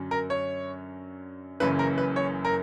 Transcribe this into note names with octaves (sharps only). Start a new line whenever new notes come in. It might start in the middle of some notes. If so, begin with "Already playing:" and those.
Already playing: F#2 D3 F#3 C#4
A#4
C#5
F#1 F#2 C#3 E3 B4
A#4
B4
C#5
A#4